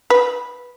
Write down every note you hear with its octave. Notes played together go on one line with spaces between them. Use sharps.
B4